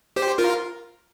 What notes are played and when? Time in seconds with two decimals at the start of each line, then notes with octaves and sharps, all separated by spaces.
0.16 G4 C5
0.38 F4 A#4